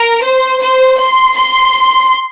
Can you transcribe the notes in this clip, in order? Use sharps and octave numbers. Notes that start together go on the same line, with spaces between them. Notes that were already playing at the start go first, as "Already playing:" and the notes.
Already playing: A#4
C5
C5
C6
C6